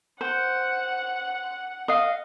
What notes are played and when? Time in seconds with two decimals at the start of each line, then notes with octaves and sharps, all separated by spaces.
0.21 C5 F#5
1.88 D#5 F5